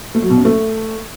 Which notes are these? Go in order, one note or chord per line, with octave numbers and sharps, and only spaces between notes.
A3
F#3
B2
F#2
A3